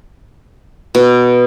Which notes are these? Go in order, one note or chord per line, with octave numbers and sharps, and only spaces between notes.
B2